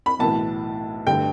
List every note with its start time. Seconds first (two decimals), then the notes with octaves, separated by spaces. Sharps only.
0.06 B5
0.19 B1 A2 E3 A5
1.07 G2 D3 A3 G5